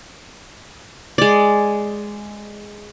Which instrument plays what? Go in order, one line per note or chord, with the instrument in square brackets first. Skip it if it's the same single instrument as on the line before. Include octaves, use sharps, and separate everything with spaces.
[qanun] G#3 D5